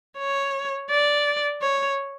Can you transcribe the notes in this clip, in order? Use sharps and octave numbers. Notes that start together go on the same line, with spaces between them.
C#5
D5
C#5